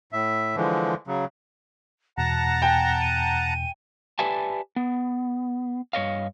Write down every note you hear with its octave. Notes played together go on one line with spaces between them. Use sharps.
A2 E5
D3 E3 F3 G#3
C#3 F#3
E2 B2 F#5 A5 A#5 A#6
G5 G#5
D#7
G4 B4 D5 E5 G#5 A5
B3
G2 C#5 D#5 F5